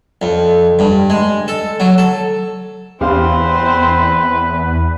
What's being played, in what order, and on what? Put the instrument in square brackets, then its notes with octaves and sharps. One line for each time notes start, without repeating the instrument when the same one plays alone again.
[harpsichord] F2
G2
G#3
A4
F#3
A4
[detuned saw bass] E2 [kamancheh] C4 C5 [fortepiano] G4 F5 [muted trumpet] B4